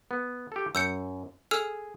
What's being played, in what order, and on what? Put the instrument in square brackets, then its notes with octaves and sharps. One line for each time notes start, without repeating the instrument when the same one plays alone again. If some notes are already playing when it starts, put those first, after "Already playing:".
[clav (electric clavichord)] B3
G4 A4
[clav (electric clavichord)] F#2 [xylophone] E6 G6 C#7
[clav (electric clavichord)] G#4 [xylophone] A4 E6 F6